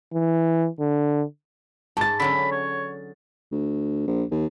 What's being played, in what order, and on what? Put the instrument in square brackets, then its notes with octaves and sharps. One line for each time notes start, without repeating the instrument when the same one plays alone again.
[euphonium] E3
D3
[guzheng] G#2 [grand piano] A5 A6
[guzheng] D3 F#3 C#4 [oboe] B5
[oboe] C#5
[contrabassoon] D2
A#1
D#2